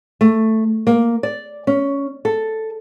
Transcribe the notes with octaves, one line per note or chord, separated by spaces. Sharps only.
A3
A#3
D5
C#4
A4